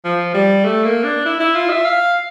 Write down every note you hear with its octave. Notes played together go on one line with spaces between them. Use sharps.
F3
G3
A3
A#3
D4
E4
E4
F4
E5
F5